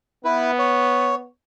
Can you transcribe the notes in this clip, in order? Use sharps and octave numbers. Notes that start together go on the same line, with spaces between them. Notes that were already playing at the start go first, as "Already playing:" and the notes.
B3 E4 B4
C#5